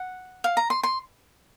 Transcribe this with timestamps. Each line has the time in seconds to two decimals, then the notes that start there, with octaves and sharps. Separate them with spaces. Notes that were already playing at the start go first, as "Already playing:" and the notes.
Already playing: F#5
0.44 F5
0.57 A#5
0.70 C6
0.83 C6